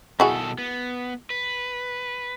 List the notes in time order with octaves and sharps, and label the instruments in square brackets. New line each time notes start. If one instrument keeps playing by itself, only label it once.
[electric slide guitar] B2 D#3 A4 [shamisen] E4 F#4 G#4
[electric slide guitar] B3
B4